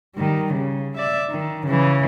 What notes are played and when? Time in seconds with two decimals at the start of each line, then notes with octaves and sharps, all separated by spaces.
0.15 D#3 G3
0.53 C#3
0.97 D5 E5
1.30 D#3
1.66 C#3 E3